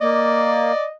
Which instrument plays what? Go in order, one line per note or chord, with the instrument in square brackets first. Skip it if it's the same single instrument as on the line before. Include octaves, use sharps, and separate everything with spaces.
[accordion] A#3 [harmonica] D5 [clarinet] D#5